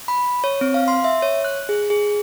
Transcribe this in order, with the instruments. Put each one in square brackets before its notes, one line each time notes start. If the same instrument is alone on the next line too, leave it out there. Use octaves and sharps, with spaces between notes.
[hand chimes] B5
C#5
C4
F5
C6
E5
C#5
F#6
G#4
G#4